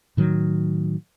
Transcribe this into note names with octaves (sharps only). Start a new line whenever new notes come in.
A2 D#3 F#3